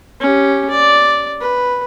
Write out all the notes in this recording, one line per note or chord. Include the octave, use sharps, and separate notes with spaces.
C#4 G4
D5
B4